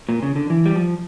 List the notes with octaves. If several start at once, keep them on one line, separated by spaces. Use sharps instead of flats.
A#2
C#3
D3
E3
G3
F3